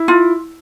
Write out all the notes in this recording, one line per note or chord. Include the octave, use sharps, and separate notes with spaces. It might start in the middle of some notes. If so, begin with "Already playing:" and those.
Already playing: E4
F4